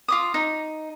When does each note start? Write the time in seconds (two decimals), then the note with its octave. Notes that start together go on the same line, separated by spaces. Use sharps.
0.08 F4 D6 D#6
0.34 D#4